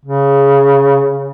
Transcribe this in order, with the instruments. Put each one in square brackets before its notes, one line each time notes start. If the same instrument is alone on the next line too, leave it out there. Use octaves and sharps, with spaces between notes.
[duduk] C#3